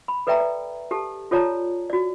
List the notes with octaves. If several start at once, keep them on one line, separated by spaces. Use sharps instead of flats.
B5
A4 B4 D5 E5 G5 A#5
D5
G4 A4 A5
F4 A4 C#5 D5 A5 A#5
F#4 D5